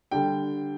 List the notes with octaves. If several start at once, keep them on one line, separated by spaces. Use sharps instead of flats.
D3 G3 D4 G5